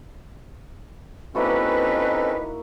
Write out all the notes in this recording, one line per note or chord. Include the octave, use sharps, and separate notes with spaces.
A#3 C4 C#4 D#4 E4 F#4 A4 B4